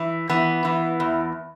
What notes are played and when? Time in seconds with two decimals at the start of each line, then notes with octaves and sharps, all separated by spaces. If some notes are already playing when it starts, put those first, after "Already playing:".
Already playing: E3
0.29 E3 B3
0.65 E3
1.00 E2